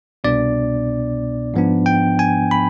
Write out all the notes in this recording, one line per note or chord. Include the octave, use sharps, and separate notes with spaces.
C2 B2 B3 D4 D5
G#2 F3 B3 D4
G5
G#5
B5